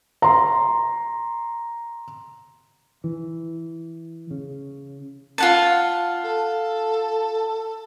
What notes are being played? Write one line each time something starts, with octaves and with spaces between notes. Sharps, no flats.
A#5 C6
E3
C#3
F4 F#5 A5
A4